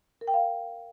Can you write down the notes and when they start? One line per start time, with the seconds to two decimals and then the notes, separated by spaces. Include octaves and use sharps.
0.21 A#4
0.27 G5
0.34 F5